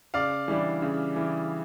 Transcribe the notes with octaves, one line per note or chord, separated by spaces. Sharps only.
C#3 D5 F5
E3 G3 D4
C#3
E3